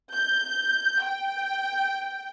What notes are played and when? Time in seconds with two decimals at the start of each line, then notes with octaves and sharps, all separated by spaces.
0.12 G6
1.03 G5